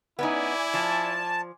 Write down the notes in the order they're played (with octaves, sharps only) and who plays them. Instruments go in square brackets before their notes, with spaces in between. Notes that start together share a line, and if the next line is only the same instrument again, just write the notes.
[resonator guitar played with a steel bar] B3 C#4 D#4 [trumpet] E4 [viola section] D5 G#5
[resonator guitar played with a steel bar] F3 [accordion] A5